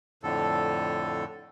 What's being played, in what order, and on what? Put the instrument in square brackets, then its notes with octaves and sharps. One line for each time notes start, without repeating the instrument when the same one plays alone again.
[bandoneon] F2 A2 D3 A4